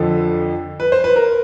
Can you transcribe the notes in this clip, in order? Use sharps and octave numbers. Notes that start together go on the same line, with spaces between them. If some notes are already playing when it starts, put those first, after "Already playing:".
Already playing: F2 D3 F3 A4
B4
C5
B4
A#4